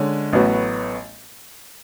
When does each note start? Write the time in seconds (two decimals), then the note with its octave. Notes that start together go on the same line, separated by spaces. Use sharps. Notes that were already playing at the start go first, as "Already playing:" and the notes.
Already playing: D3 G#3 C#4
0.33 A1 A2 F#3 B3 F#4